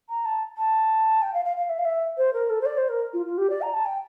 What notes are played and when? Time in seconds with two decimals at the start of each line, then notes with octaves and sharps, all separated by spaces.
0.09 A#5
0.25 A5
0.57 A5
1.22 G5
1.34 F5
1.45 F5
1.57 F5
1.69 E5
1.79 F5
1.85 E5
2.18 C5
2.33 A#4
2.50 A4
2.61 C5
2.66 D5
2.77 C5
2.89 A#4
3.13 F4
3.26 F4
3.38 G4
3.50 D5
3.62 A#5
3.74 A5
3.85 G5